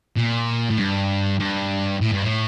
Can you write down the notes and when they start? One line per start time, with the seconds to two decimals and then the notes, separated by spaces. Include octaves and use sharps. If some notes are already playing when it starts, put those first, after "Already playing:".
0.17 A#2
0.70 A2
0.78 G2
1.39 G2
2.01 A2
2.12 G2
2.23 A2